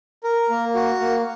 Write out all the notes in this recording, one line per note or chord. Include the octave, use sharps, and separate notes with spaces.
A#4
A#3
F#4
A#3